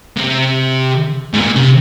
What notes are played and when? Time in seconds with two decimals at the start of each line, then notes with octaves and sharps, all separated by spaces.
0.17 C3
1.34 G#2
1.39 A#2
1.56 C3